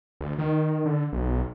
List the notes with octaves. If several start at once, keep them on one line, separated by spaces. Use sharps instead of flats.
D2
D#3
D3
B1